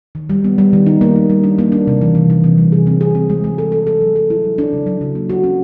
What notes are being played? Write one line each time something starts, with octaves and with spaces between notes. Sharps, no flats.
D#3
G3
B3
G3
D#3
D#4
A#3
A#3
G3
D4
A#3
D4
C3
E3
E3
E3
C3
G3
G#4
C4
G#4
C4
G#3
G#3
A4
A4
A4
F#3
A4
E4
F#3
D4
C#3
F#3
C#3
A#3
F#4
C#4